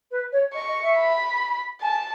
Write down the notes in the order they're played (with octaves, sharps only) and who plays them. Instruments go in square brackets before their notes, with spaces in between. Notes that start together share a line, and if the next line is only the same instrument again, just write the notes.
[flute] B4
C#5
[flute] D#5 [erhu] C#6
[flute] D#5
E5
[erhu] B5
[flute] G#5 [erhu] A5